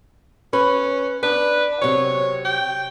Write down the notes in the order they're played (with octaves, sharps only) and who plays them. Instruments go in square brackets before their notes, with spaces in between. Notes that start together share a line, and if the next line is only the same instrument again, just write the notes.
[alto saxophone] C#4 [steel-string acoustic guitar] B4
[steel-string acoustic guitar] D4 [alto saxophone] B4
[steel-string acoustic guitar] C3 F#3 [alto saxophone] C#5
[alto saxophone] G5